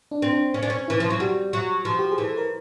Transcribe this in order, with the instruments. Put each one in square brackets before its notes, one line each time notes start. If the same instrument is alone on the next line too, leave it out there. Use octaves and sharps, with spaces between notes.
[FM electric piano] D4
[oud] C4
[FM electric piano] D4
[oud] C#4
D4
C#4
[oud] E3 [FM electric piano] E4
[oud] F3
F#3
[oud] G3 [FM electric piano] F#4
[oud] F#3
F3
[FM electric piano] G4
G#4
[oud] E3
[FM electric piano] A4
A#4